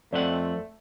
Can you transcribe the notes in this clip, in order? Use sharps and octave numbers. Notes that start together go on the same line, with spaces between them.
F2 A3 C4 D5 F#5